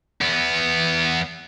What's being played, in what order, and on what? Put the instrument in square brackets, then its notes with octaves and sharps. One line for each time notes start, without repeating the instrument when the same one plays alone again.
[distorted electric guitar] E2 B3